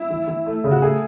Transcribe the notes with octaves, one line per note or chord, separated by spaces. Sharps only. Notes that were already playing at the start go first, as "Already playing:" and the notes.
Already playing: E4
E3
E3
A3
C#3
F#4
A3 G#4